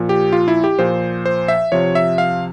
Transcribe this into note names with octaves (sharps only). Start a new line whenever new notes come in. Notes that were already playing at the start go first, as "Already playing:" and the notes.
Already playing: A#2 F3
G4
F4
E4
G4
A#2 F3 C5
C5
E5
C3 F3 C#5
E5
F5